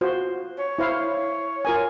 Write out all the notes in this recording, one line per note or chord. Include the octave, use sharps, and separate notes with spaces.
F4 F#4 C5
C#5
E4 C5 F5
F4 A#4 G#5